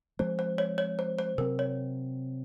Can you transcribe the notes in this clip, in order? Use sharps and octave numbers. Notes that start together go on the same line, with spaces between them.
F3 G#3 C4 C5
C5
C#5
C#5
C5
C5
C3 F#3 C4 A#4
C#5